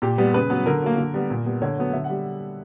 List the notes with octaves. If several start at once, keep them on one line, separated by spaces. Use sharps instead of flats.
A#2 G4
G3 B3
C#3 B4
F#3 B3
D3 A#4
F#3 A#3
D3
G3 B3
A#2
G3 B3
D3 C#5
F#3 B3
D3 E5
F#5
G3